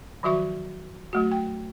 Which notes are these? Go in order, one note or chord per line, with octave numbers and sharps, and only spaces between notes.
D#3 F3 F#3 F#4 E5 C#6
F#3 A3 F#4
G5